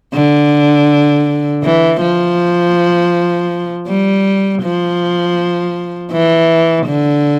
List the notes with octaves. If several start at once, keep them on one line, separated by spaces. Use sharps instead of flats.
D3
E3
F3
G3
F3
E3
D3